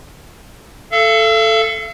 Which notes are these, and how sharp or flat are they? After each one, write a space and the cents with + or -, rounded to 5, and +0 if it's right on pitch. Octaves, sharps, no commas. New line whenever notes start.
A4 +0 F5 -45